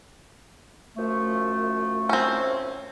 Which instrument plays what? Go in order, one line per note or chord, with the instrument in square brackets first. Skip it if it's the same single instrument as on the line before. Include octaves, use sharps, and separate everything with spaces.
[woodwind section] F#2 F3 A3
[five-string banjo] C4 C#4